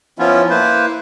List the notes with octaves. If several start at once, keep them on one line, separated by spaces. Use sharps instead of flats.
F3 B3 C#4 E4 F4
A#3 E4 B4 C5